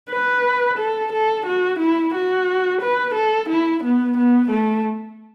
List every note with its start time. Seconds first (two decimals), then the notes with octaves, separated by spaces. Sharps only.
0.10 B4
0.78 A4
1.12 A4
1.46 F#4
1.79 E4
2.14 F#4
2.81 B4
3.15 A4
3.49 E4
3.84 B3
4.17 B3
4.51 A3